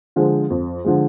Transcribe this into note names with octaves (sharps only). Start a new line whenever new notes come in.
D3 F3 G#3
F2
D3 F3 G#3